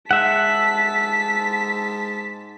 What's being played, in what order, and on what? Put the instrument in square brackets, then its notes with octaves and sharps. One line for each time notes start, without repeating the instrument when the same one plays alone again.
[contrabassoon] G#2 [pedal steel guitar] E5 F#5 [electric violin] A5 B6